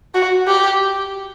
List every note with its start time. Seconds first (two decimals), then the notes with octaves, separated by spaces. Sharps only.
0.15 F#4
0.48 G4